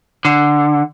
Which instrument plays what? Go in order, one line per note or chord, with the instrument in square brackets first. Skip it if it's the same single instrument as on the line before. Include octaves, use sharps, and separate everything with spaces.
[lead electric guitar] D3